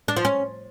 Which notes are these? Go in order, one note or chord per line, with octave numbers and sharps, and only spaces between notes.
D4
F3
C#4